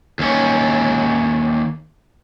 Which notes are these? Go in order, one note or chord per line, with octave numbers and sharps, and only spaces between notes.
D#2 C#4